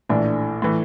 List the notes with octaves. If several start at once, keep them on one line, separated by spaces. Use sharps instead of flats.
A#1 A2 E3 D4
A2 E3